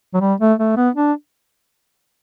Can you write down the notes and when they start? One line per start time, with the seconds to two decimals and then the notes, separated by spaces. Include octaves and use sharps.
0.14 F#3
0.21 G3
0.40 A3
0.59 A3
0.77 B3
0.95 D4